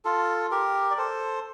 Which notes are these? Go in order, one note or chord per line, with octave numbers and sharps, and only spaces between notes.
F4 A4
G4 A#4
D5
A4 C5